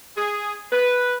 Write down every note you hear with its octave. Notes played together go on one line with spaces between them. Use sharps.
G#4
B4